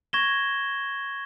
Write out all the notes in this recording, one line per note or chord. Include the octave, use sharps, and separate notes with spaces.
C#6 G#6 A#6 E7 G7